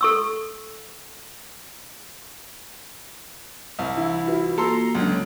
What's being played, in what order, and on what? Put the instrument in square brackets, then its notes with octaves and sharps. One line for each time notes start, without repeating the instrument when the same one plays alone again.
[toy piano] A4 C#6 E6
[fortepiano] C2
[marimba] E3 D4 F5 [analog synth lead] E4
[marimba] F4 F#4 B4
[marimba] A#3 F4 F#4 [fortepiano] A4 C6 [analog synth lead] A#5
[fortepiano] C#2 D3 [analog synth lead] F#3